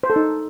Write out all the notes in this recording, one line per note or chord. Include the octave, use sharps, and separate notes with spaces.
C5
A4
D#4